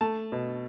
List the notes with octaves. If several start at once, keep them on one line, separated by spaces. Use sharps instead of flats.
A3 A5
B2